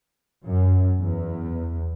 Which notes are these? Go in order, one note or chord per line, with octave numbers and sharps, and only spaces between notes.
F#2
E2